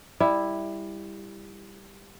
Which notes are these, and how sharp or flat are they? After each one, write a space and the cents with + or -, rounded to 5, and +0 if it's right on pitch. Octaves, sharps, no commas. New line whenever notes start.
G3 +15 E4 +0